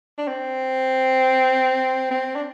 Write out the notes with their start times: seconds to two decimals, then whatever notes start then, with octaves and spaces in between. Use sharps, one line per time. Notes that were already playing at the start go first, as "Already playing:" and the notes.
0.18 D4
0.27 C4
2.11 C4
2.35 D4